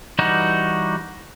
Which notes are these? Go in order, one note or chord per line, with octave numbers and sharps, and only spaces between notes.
E3 G3 D#4 F#4